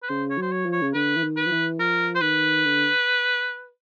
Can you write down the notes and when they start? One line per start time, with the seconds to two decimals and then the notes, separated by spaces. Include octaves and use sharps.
0.03 B4
0.09 C#3 C5
0.30 C#5
0.38 F#3 C5
0.52 C#5
0.66 F3
0.73 C#5
0.82 C#3
0.94 D3 B4
1.16 E3
1.23 D#3
1.37 B4
1.46 F3
1.51 E3
1.79 F3 A#4
2.15 C5
2.21 D#3 B4
2.65 D3